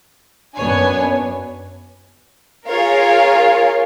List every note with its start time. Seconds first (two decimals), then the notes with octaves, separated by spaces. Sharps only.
0.56 F#2 B3 D4 C#5 G#5
2.69 F4 G#4 A#4 C#5 F5